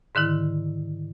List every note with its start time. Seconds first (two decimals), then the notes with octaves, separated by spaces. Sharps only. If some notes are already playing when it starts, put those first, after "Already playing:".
0.15 G#2 D3 D#3 E4